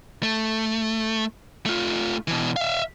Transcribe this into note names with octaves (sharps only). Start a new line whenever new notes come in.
A3
A3 F4
B2 E3
E5 F5